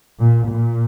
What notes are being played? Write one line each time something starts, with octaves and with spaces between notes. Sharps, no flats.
A#2
A#2